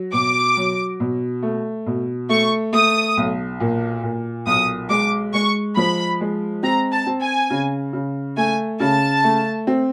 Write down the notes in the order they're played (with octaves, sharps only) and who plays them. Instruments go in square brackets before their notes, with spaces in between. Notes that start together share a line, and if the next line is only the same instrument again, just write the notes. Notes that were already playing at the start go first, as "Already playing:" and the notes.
Already playing: [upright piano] F#3
[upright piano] B2 [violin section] D6
[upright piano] F#3
B2
A3
B2
[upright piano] A3 [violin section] C#6
[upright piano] A3 [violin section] D#6
[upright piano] B1
A#2
A#2
[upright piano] B1 [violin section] D#6
[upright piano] G#3 [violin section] D6
[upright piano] G#3 [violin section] C#6
[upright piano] F3 [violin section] B5
[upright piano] G#3
[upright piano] C4 [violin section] A#5
[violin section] A5
[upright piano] C4
[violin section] G#5
[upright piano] C#3
C#3
[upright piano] A3 [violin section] G#5
[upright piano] C#3 [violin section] A5
[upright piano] A3
C4